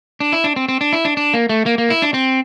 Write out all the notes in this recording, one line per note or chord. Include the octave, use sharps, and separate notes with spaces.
D4
E4
D4
C4
C4
D4
E4
D4
D4
A#3
A3
A#3
A#3
E4
D4
C4